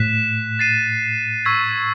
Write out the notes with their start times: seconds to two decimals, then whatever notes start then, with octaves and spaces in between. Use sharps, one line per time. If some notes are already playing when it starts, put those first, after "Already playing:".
Already playing: A2 F#6 B6 E7
0.59 A6 C7 D#7
1.45 C#6 E6 G#6 B6 D#7